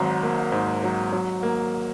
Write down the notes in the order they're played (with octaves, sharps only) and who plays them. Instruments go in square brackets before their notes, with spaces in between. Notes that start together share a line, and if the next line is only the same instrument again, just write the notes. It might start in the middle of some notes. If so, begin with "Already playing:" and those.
Already playing: [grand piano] G#1 G#2 F#3
A#3
G#2
F#3
F#3
A#3